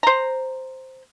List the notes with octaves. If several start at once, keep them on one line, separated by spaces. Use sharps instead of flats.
C5 A#5